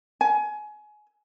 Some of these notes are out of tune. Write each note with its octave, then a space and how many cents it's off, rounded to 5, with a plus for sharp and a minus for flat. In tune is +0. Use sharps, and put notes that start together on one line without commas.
G#5 +25